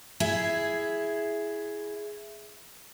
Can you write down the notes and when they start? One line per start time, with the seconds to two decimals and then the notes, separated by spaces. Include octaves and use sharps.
0.20 E4 G#4